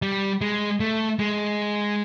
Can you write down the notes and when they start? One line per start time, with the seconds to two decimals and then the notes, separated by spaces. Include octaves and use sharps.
0.02 G3
0.41 G#3
0.80 A3
1.19 G#3